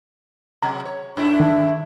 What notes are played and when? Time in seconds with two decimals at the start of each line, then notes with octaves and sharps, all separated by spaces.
0.62 C3 F#3 G#3 A#5 G#6
0.85 C#5
1.17 G2 A3 D4 E4
1.40 D#3